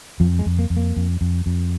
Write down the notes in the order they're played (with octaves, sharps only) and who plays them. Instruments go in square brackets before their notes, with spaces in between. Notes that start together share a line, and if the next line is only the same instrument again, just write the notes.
[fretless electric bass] F2 F3
G#3
F2
A#3
F2
A#3
F2
F2
F2